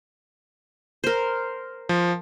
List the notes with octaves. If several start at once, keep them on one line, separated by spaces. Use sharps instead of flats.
A#4 C5
F3